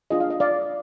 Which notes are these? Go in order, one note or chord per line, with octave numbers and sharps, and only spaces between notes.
D4 F4 G#4 D#5
F5
D#5
D5 F5